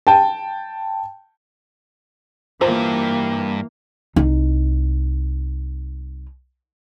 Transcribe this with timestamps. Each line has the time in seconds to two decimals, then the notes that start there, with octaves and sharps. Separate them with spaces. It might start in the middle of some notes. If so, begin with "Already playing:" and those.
0.07 G5 A5
2.61 G2 E3 A#3 F4 C5 A#5
4.16 C2 D#4